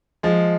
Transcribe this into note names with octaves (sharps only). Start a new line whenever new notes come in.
F3 G#3